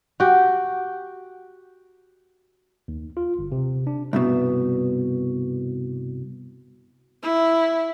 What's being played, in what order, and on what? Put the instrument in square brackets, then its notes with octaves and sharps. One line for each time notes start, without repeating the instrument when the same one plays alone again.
[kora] F#4 G4
[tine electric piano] D#2
F4
G1
C3
D4
[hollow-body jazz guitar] C2 G2 B2
[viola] E4